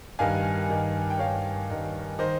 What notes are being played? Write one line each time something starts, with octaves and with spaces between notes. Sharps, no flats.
G2 D#3 F5 G#5
G2 D#3
G5
G2 D#3 C#5 F5
G2 D#3
D#3 C5 D#5